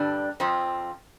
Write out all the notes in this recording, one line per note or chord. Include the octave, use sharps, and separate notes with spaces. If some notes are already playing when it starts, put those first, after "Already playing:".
Already playing: G2 D3 G3 D4
F2 F3 C4